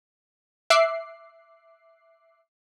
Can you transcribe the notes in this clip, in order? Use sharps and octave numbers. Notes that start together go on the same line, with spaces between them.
E5 D6 F#6 C7